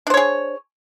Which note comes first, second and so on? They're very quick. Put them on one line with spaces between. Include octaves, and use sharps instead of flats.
D4 C5 C#5 G#4